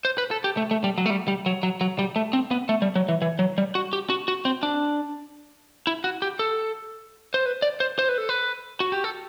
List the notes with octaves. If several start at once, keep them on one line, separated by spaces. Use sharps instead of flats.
C5
B4
A4
G4
A3
A3
G3
F#3
A3
G3
G3
F#3
F#3
F#3
G3
A3
C4
B3
A3
G3
F#3
E3
E3
F#3
G3
F#4
G4
F#4
F#4
C4
D4
E4
F#4
G4
A4
C5
B4
D5
C5
C5
B4
A4
B4
F#4
G4
A4